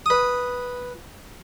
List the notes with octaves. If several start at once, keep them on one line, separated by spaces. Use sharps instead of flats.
B4 D#6